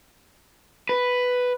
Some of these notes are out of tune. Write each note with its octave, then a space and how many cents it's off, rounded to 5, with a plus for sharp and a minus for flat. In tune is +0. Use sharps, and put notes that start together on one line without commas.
B4 +5